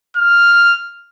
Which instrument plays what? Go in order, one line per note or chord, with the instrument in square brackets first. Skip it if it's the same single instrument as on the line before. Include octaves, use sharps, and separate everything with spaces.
[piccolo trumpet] F6